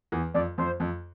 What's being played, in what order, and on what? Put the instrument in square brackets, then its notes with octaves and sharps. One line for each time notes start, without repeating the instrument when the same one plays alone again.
[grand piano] E2
[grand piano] F2 [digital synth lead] D5
[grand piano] F2 [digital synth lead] C5
[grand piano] F2